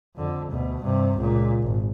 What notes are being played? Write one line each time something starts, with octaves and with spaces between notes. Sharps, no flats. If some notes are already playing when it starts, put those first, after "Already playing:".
F2 D3
D2 B2
G2 C3
C#2 A#2
G#1